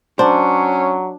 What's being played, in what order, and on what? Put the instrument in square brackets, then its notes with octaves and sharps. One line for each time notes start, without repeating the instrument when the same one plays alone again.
[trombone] F#3 [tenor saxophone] C#4 [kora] D4 [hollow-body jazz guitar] C5